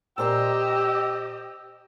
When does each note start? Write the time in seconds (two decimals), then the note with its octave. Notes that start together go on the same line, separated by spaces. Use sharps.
0.18 A#2 G4 C5 D#5 A#5 E6